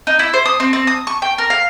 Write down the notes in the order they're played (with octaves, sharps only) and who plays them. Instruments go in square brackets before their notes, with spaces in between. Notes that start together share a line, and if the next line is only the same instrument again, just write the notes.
[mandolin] D#4
E4
C5
D#6
C4
C4
D#6
C#6
G5
A#4
F5